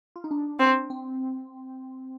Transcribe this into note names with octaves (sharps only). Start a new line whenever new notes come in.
F4
D#4
D4
C4
C4